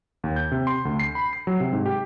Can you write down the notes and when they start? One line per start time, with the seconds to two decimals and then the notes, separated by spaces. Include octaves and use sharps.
0.24 D#2
0.36 G6
0.51 C3
0.67 C6
0.85 D2
1.00 C7
1.15 B5
1.33 C7
1.47 F#3
1.60 C3
1.72 G#2
1.86 G4